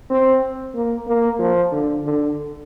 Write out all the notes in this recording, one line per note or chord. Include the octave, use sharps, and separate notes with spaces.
C4
A#3
A#3
F3
D3
D3